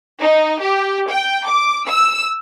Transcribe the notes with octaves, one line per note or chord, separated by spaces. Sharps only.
D#4
G4
G5
D6
E6